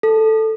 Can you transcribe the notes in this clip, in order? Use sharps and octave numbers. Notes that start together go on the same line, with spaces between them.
A4